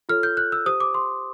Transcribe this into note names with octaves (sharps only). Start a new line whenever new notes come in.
F4 A4 C#5 F6
G6
F#6
E6
G4 C5 D#6
D6
C6